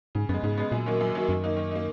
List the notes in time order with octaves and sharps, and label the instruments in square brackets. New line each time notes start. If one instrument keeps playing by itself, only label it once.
[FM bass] G#2 [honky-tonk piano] C#3
[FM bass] F#2 [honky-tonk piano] G#3 B3
[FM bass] G#2 [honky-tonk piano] C#3
[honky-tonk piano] G#3 B3
[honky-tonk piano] F#2 [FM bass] A#2
[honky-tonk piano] D#3 F#3 A#3
F#2
D#3 F#3 A#3
[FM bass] F#2 [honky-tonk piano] D#3
[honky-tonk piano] A#3 D#4
D#3
A#3 D#4